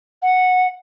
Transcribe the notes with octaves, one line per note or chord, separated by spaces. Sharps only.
F#5